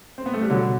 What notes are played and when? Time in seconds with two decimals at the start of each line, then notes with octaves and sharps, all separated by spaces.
0.18 C4
0.26 B3
0.34 A3
0.42 G3
0.50 B2 D3 F#3